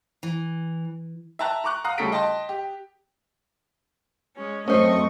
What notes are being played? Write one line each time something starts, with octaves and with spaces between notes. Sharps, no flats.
E3
E5 G5 A5 A#5 F#6
A#5 C#6 D6 F#6
F5 F#5 A#5 D#6 F#6
D2 C#3 G3 A4 B6 D7
D#5 G5 A5 C6
G4
G#3 C#4
F#2 A3 C4 C#4 C5 D#5 C#6